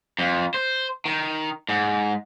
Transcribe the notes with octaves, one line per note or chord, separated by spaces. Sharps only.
F2
C5
D#3
G#2